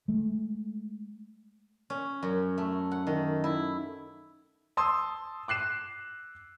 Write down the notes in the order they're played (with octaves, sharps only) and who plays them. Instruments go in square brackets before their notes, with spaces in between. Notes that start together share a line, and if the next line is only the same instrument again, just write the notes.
[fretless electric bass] G#3 A3
[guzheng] C#4
F#2
A3
F#5
D#3
E4
[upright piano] A5 C6 D#6 E6
D6 F#6 C7 E7